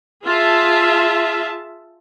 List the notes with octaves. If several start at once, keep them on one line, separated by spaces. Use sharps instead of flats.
F4 G#4 E5 A5